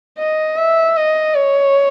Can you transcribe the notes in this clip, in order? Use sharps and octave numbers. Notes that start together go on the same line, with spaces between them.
D#5
E5
D#5
C#5